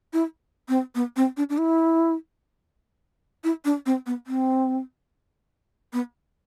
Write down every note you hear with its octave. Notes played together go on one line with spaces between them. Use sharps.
E4
C4
B3
C4
D4
D4
E4
E4
D4
C4
B3
C4
B3